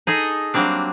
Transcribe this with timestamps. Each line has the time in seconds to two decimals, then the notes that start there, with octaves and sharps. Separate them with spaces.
0.07 D#4 G#4 A4 D#5
0.54 F#3 G3 A#3 C4 D4